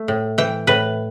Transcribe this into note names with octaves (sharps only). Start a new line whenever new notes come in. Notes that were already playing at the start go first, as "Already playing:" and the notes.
Already playing: A3
A2
E3 G5
A2 B4